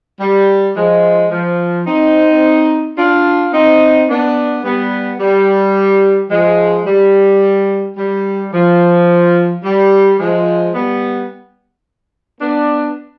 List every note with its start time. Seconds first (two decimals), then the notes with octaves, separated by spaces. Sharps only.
0.20 G3
0.76 F3 G#3
1.31 F3
1.86 C4 D#4
2.97 D4 F4
3.53 C4 D#4
4.09 B3 D4
4.63 G3 B3
5.20 G3
6.30 F3 G#3
6.86 G3
7.97 G3
8.52 F3
9.64 G3
10.19 F3 G#3
10.74 G3 B3
12.41 B3 D4